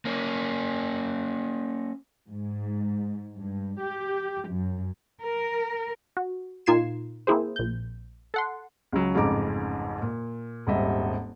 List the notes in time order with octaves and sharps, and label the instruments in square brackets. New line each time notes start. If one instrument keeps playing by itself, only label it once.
[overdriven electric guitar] A#3 C#4
[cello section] G#2
G2
G4
F#2
A#4
[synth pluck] F#4
A#2 D#4 F4 G#6 C7 E7
A#3 C4 E4 G#4 C5
A#1 G6
A4 F#5 C6
[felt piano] C#2 C#3 F#3
A1 F2 G#2 C#3 A#5 D6
A#2
D#1 G#1 G3 D#5 E5